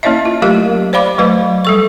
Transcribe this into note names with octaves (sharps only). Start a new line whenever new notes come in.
A#3 C#4 E4 C#5 D#5 E5
F4
F#3 A3 G4 A#4 D#5 F5
C5 D5 F5 B5 D6
F#3 A3 B4 D#5
G3 A4 C#6